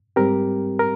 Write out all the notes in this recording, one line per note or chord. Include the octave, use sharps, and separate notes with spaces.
G#2 G3 C4 G4 A#4
A#4